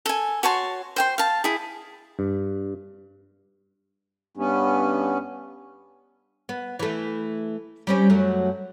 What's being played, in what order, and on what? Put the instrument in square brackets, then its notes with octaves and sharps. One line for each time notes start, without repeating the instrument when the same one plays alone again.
[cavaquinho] A4 G#5
F#4 C#5 A5 C6
C5 G5 C6
F5 A5
E4 G#4
[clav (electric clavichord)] G2
[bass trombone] G2 [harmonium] B3 C#4
[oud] B3
E3 A3
G3 C4 C#4
F#2 F#3 A3